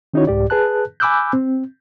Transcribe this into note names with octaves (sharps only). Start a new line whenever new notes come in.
D#3 C#4 D#4 E4 F#4 C#5
C2 G#2 G4 D5
G#4 B4 A5 F#6
G#5 B5 D6 E6 F#6 G6
C4